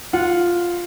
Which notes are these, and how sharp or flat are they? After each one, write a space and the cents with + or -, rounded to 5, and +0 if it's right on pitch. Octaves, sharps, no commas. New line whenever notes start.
F4 +0 F#5 -20